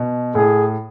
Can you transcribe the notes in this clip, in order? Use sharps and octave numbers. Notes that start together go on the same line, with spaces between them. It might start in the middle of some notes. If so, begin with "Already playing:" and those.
Already playing: B2
A2 G#4